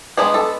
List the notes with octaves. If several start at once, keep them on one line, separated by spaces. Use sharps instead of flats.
G#3 B3 D4 G#4
A4